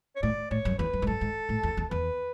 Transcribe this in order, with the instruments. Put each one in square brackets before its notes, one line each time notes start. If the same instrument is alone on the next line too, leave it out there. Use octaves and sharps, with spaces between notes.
[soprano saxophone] C#5
[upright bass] A2 [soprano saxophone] D5
[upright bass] A2 [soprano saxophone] C#5
[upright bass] F#2
[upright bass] E2 [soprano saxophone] B4
[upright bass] F#2
G#2
[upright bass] F#2 [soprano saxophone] A4
[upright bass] G#2
A2
E2
E2
[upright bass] E2 [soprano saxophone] B4